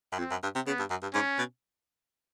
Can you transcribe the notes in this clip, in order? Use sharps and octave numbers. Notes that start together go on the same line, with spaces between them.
F#2
F2 C4
F#2
G2
C3
C#3 B3
G2
F#2
G2
G#2 C#4
B2